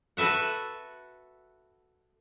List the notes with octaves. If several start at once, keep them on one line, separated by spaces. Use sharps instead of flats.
F#4 A4 B4 E5 F#5